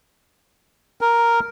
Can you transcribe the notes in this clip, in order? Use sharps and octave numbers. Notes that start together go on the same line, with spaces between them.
A#4